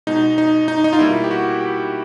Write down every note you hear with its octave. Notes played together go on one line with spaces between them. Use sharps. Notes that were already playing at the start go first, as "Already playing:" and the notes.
B2 G#3 D#4
D#4
D#4
D#4
F4
B2 G3 A#3 E4
G4
F#4
G4